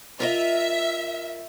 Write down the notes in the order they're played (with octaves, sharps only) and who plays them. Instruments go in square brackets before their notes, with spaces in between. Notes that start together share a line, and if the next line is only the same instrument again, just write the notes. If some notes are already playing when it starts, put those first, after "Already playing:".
[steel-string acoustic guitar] F4 A#4 D#5 [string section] E5